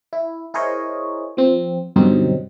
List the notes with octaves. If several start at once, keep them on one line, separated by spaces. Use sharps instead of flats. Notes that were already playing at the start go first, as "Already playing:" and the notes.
E4
E4 G#4 A#4 C5 C#5 D#5
F3 C4
G2 B2 D3 F#3 C4 D#4